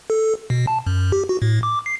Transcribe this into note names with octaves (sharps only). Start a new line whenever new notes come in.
A4
B2
A5
F#2
G4
F#4
A2
D6
C7